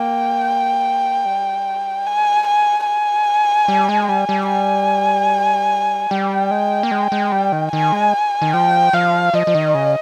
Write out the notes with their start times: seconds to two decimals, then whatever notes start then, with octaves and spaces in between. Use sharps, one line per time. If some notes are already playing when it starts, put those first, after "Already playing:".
Already playing: A#3 G5
1.26 G3
2.06 G#5
2.47 G#5
2.87 G#5
3.68 G3
3.89 G#3
4.09 G3
4.29 G3
4.49 G#5
6.11 G3 G5
6.51 G#3
6.83 A#3
6.91 G#3
7.12 G#3
7.32 G3
7.52 D#3
7.72 D#3 G#5
7.92 G#3
8.42 D#3
8.54 F3 G5
8.93 F3 F5
9.34 F3 D#5
9.47 F3
9.55 D#3
9.75 C#3